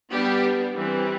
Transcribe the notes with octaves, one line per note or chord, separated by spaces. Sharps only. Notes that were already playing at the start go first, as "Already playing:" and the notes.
G3 B3 D4 G4
E3 G3 C4